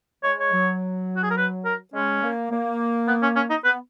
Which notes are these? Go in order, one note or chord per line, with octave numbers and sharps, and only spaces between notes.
G#3 C#5
C#5
F#3
F#4
G#4
A#4
B4
A#4
G#3 C#4
A#3
A#3
B3
C#4
C#4
D#4
B3 B4